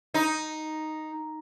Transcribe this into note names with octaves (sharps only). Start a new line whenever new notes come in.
D#4